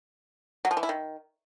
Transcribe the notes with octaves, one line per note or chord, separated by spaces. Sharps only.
F#3
F3
E3
E4
D#3